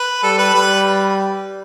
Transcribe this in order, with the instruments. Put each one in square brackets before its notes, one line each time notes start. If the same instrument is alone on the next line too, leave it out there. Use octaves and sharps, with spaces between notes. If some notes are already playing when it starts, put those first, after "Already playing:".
Already playing: [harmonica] B4
[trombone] G3 [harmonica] A4
[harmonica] B4
[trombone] G3 [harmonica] B4